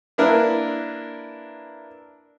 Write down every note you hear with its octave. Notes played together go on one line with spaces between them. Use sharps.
A#3 D4 E4 A#4 B4